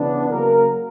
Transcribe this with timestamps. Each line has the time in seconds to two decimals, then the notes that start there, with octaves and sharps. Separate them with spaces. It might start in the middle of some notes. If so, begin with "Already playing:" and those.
Already playing: C#3 E3 B3 D4
0.29 C#3 F#3 A#3 A#4